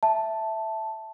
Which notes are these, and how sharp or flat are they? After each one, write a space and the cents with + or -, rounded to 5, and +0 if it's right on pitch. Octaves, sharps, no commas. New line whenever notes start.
E5 +0 A5 +0